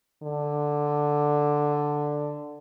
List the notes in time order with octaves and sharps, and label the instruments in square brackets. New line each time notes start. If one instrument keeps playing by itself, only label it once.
[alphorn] D3